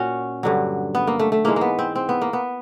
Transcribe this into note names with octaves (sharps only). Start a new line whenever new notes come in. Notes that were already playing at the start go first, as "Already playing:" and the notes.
Already playing: A#2 C#4 F#4
G2 D3 F#3
B3
A#3
A3
A3
G#2 E3 G#3 A#3
A#3
B3
C4
C4
B3
A#3
B3